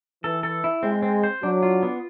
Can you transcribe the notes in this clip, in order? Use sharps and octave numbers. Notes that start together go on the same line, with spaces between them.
E3 A4
A4
E4
G#3 C4
C4
C5
F#3 D4
F4
B3